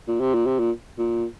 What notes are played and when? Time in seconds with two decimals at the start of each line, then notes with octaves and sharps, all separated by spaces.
0.08 A#2
0.20 C3
0.34 A#2
0.46 C3
0.59 A#2
0.98 A#2